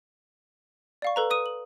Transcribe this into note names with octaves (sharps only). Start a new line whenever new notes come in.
D5 F5 C#6
A4 B4 A#5
B4 D#6 D#7
F#7